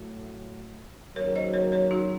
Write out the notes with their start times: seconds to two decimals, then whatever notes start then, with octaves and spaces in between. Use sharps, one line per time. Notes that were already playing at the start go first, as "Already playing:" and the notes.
Already playing: A2 F#3 A3
1.16 D#2 C#3 F#3 A#4 C#5
1.35 C5 D#5
1.53 A#4 C#5
1.72 A#4 C#5
1.91 D#4 F#4